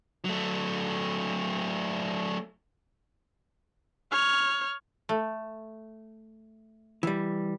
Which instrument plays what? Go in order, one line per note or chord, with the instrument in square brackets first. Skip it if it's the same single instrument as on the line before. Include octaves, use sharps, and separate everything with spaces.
[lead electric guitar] F#3 A3
[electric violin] C#5 F6
[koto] A3
[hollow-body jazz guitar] E3 G3